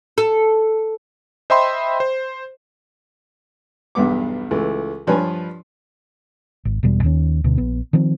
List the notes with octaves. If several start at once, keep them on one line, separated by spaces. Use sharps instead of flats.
A4
C5 D#5 E5 G5 B5 C6
C5
B1 E2 G2 B3 D6
C#2 E3 A3
G2 F3 D4 B4 C#5 G#5
G#1
E1 B2 G3
D#2 D#3 C#4
D2 B2
A#1 B3
D#3 F3 C4